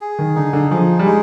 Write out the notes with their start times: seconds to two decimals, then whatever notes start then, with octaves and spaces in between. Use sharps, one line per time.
0.01 G#4
0.19 D#3
0.36 D3 D#4
0.53 D3
0.71 F3 G#4
0.99 G3
1.06 G#3 D#4